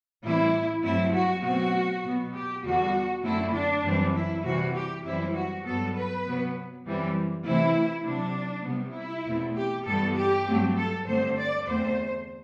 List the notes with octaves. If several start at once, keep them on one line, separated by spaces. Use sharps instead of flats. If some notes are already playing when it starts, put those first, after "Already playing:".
A2 E3 G3 C4 E4
G2 F#3 A3 C4 E4
F#4
B2 F#3 A3 C4 F#4
B2 F#3 B3
G4
E2 D3 G3 B3 F#4
F#2 D3 A3 C4 E4
D4
F#2 E3 G3 C4
E4
C3 E3 G3 F#4
G4
F#2 E3 G3 C4 E4
F#4
G2 F#3 B3 A4
B4
C3 F#3 B3
F#2 E3 G3 C4
C3 E3 A3 C4 E4
C3 F#3 C4 D4
C3 G3 B3
E4
E2 B2 A3 C4
G4
G2 E3 G3 B3 A4
G4
G2 F#3 A3 C4
A4
G2 D3 A3 C4 C5
D5
E2 D3 A3 C4 C5